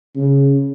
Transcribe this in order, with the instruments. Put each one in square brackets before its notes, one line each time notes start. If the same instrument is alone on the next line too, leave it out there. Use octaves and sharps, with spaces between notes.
[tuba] C#3